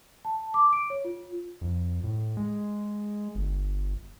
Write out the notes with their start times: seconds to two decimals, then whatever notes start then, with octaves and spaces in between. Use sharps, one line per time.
0.25 A5
0.54 D6
0.73 D7
0.90 C#5
1.05 F4
1.61 F2
2.04 A2
2.37 G#3
3.35 G1